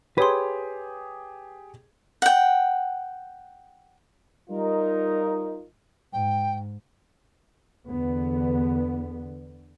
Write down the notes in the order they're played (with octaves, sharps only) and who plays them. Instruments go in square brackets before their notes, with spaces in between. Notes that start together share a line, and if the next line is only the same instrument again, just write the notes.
[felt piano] G4 G#4 [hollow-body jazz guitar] B4 [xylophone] C#5 C6
[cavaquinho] F#5 G5
[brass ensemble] G3 D#4 F4 A#4
[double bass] G#2 [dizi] G5
[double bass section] E2 D3 B3